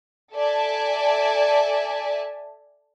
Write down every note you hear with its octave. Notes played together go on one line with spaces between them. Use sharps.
A4 D5 E5 G#5 A5